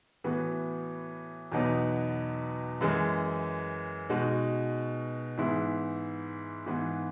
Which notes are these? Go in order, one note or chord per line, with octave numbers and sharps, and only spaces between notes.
A2 E3 B3 F#4
E2 B2 F#3 B3 D#4
F#2 E3 G#3
B2 G#3 D#4 F#4
G#2 E3 B3 E4 G#4
G#2 E3 B3